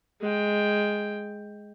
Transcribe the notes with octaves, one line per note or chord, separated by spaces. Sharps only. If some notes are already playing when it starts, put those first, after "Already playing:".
G#3 G5